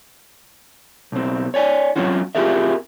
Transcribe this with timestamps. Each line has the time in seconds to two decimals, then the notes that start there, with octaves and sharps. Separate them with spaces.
1.12 B1 C4
1.54 C#5 D5 G#5
1.96 F#3 G3 C4 C#4 F4 F#4
2.35 C4 F4 G4 G#4 A#4 E5